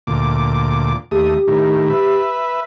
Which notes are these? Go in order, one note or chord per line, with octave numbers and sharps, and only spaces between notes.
D2 A#2 D6
D#2 A3 G4 D#6
A2 D#3
B4 E5